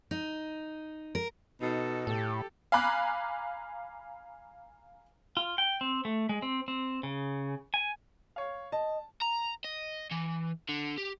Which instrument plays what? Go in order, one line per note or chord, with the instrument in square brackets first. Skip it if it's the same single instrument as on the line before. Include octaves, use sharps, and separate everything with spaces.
[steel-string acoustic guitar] D#4
A#4
[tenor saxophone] B2 [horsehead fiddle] D#4 A4
[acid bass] A2 [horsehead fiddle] G4 A4
[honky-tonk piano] F5 G#5 A#5 B5 D6 F#6
[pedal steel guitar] F4
G5
C4
A3
G#3
C4
C4
C#3
G#5
[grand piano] C#5 F5
[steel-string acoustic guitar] D#5 [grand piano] A5
[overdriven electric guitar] A#5
D#5
E3
D3
G4